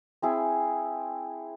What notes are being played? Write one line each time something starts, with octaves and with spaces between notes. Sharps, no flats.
C4 E4 G#4